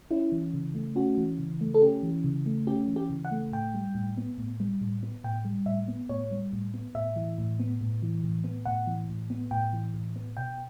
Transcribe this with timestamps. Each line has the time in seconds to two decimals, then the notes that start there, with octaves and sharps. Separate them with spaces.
0.11 C#4 E4
0.32 E3
0.54 C#3
0.75 A3
0.95 C#4 F#4
1.18 E3
1.38 C#3
1.61 A3
1.74 A4
1.82 C#4 G4
2.03 E3
2.24 C#3
2.46 A3
2.67 C#4 G4
2.88 E3
2.96 G4
3.10 C#3
3.25 F#5
3.31 A3
3.52 A2 G5
3.74 G3
3.95 A2
4.17 B3
4.38 A2
4.60 G3
4.81 A2
5.03 B3
5.24 A2 G5
5.45 G3
5.66 A2 E5
5.88 B3
6.09 A2 C#5
6.31 G3
6.53 A2
6.74 B3
6.95 A2 E5
7.16 E3
7.38 A2
7.59 B3
7.81 A2
8.03 E3
8.23 A2
8.44 B3
8.65 A2 F#5
8.87 E3
9.09 A2
9.30 B3
9.51 A2 G5
9.73 E3
9.94 A2
10.16 B3
10.37 B2 G5